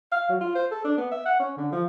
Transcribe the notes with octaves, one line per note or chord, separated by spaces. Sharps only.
F5
F#3
F4
C5
A4
D4
B3
E5
F#5
C#4
D3
F3